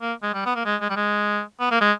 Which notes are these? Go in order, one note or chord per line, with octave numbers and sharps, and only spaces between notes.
A#3
G#3
G3
B3
A#3
G#3
G#3
G3
G#3
B3
A#3
G#3